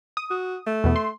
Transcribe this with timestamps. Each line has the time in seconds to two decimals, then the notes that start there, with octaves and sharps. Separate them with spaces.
0.17 D#6
0.31 F#4
0.67 A3
0.84 E2 B2 B3
0.96 C6